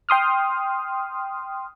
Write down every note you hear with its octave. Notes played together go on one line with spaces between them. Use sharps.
G5 C6 D#6 F6